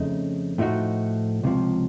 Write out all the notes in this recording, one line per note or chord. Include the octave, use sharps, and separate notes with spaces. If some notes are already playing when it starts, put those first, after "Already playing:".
Already playing: F2 C#3 A3 D#4
A2 F3 A3 D#4 F#4
C#2 C3 F3